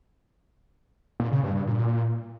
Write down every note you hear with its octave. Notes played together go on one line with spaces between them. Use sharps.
A#2
C#3
G2
G2
A#2